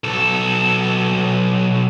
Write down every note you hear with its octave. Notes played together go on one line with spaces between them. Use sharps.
B1 A4